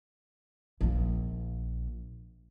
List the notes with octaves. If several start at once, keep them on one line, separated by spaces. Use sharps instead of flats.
A#1 A#3